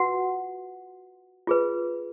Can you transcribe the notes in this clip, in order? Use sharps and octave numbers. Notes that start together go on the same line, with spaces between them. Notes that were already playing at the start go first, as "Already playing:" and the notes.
Already playing: F4 F#4 B4 F#5
F4 G#4 B4